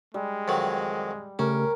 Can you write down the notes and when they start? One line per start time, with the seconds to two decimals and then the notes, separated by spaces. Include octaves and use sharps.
0.14 G3 G#3
0.48 F2 D#3 F#3
1.39 C#3 A3 C#4 G4 A#4